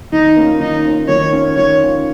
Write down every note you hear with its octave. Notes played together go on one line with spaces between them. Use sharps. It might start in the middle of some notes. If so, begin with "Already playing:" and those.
D#3 D#4
A#3 C#4 F4
D#3 D#4
A#3 C#4 F4
D#3 C#5
C#4 F4
D#3 C#5
C#4 F4